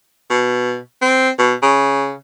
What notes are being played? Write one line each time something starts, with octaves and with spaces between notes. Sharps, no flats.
B2
C4
B2
C#3